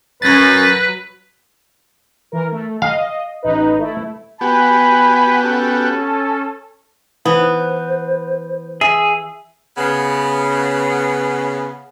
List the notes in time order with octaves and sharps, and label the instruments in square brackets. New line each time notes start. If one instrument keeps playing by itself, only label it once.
[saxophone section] F#2 [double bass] F#3 [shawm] B4 [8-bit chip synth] A6 A#6
[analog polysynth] E3 A#4
A3
[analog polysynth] D#5 [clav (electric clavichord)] F5
[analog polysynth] A1 D#4 B4
A3 E4
[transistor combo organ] B3 F#4 G4 [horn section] G#5 B5
[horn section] C#4 A4
[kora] E3 [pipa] B3 [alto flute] C5
[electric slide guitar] G#4 [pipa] E5
[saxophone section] C#3 B3